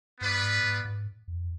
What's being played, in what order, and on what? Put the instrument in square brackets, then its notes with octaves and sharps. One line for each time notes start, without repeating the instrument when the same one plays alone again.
[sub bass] G2 [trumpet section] B3 F4 B4 D5
[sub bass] G#2
G#2
G#2
F2